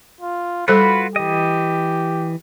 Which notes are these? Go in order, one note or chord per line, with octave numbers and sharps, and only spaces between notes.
F4
G3 F4 F#4 A4 B4 C5 B5
E3 G4 D#5